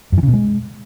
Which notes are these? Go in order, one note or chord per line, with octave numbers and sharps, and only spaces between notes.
F#2
E3
C#3
B2
G#3